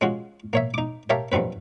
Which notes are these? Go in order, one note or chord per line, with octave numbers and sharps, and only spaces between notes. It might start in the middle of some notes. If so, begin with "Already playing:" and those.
G#3 C#4 F4 F#4
A#3 C#5 E5
D#4 D6
G4 A#4 C#5 E5 F5 A5
A#1 G2 F#3 C4 B4